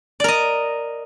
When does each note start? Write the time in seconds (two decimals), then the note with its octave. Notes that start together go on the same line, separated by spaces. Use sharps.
0.20 D5
0.24 A#4
0.28 D#5